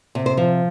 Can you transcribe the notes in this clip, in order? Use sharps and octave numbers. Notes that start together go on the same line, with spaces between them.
C3
C5
F3